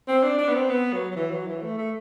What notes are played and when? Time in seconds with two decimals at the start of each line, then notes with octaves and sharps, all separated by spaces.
0.08 C4
0.23 D4
0.38 D4
0.48 B3
0.54 C4
0.69 B3
0.93 F#3
1.11 F#3
1.16 E3
1.31 F#3
1.47 E3
1.62 A3
1.78 A3